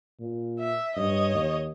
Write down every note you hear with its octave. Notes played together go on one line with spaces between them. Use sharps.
A#2
E5
G2 C#5 D#5
D#2